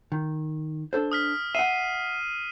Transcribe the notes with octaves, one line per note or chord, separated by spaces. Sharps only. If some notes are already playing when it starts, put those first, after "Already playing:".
D#3
D4 A4 C5
D#6 F6 B6
E5 F#5 C7 D#7